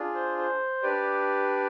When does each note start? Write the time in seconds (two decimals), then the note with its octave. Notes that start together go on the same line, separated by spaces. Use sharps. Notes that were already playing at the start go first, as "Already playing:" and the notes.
Already playing: D4 F4 G#4
0.14 C5
0.37 C5
0.83 D4 G4 B4 D5